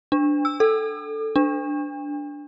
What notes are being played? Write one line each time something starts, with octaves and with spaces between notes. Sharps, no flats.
D4
E6
A4
D4